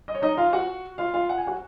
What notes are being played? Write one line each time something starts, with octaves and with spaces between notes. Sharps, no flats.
D#5
C#5
D#4 D#5
F4 F5
F#4 F#5
F4 F5
F4 F5
F#5
G#5
F#4 F#5